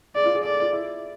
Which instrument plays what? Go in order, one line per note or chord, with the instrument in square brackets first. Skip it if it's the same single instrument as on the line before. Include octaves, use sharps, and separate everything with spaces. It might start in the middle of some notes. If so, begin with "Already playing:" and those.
[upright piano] G#4 [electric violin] D5
[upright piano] F4
G#4
[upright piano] A4 [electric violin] D5
[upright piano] F4
E4